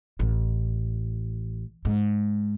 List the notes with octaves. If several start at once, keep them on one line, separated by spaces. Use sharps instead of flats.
A1
G#2